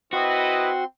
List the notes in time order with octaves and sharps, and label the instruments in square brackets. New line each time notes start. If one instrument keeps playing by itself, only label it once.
[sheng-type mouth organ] C4 C6 [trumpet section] E4 B4 D#5 [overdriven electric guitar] F#4